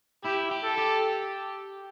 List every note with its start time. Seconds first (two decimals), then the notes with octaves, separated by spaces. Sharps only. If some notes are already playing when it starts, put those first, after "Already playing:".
0.24 E4 G4
0.51 G4
0.64 A4
0.78 G4